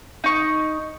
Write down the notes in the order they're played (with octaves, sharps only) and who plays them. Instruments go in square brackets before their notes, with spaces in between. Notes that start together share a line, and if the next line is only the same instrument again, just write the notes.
[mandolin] D#4 C#6